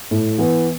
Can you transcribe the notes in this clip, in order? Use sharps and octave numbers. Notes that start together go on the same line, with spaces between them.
A2
E3 B3